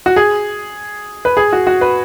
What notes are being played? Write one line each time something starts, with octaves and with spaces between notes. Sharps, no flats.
F#4
G#4
B4
G#4
F#4
F#4
B4